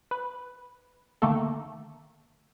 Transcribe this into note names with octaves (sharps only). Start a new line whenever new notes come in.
B4
D3 D#3 A3 A#3 A4